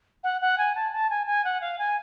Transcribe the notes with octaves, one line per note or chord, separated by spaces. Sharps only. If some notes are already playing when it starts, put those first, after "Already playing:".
F#5
F#5
G#5
A5
A5
G#5
G#5
F#5
F5
G#5